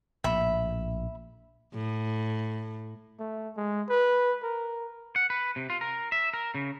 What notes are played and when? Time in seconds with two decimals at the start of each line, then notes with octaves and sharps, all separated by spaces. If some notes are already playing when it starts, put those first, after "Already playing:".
0.24 A#1 A2 E5 B5
1.74 A2
3.19 A3
3.57 G#3
3.89 B4
4.43 A#4
5.16 F#5
5.30 B4
5.56 C3
5.70 F4
5.81 A#4
6.12 E5
6.34 A#4
6.55 C#3